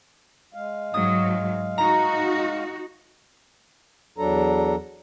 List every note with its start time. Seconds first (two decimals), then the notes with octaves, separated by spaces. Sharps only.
0.54 G#3 F5
0.94 G#2 F#3 D#6
1.78 D#4 F#4 A#5
4.18 E2 F#3 D4 A4 A#5